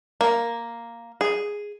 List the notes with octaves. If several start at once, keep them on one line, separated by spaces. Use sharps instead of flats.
A#3
G#4